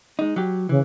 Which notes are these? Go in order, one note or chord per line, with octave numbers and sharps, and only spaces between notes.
G#3 D#4
F#3 G4
C#3 E3